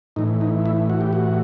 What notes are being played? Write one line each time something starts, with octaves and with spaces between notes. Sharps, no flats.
A2 E3 D#4
D#4
E4
F#4
G4
F#4